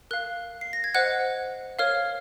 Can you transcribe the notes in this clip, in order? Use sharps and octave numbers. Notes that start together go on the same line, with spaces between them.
A#4 F5 F#6
C7
A#6
G#6
C5 D#5 F#5 F#6
A#4 C#5 F5 F6